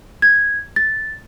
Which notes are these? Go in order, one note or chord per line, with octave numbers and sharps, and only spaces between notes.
G#6
A6